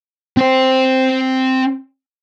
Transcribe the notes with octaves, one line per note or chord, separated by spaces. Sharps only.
C4 C5